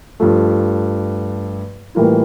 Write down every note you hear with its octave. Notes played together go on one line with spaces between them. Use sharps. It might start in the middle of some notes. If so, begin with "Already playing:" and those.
G2 F3 A3
A2 E3 G3 A#3 F4